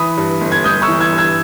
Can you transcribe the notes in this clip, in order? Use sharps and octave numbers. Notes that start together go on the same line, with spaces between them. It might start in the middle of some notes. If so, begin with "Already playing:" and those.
Already playing: E3 B5 D#6
G2
G1
G#6
G1 D#6 G6
C#6 E6
E3
E6 G#6
G2
E6 G#6